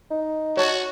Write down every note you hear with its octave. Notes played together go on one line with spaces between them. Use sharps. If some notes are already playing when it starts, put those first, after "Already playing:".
D#4
F#4 C#5 A5